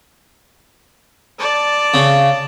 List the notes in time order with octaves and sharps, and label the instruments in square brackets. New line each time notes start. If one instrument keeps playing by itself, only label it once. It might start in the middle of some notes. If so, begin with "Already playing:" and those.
[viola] D5 A5
[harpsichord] C#3